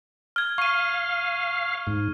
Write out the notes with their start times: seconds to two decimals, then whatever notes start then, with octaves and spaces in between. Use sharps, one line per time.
0.36 F6 G#6
0.58 F5 C#6 D#7
1.87 G#2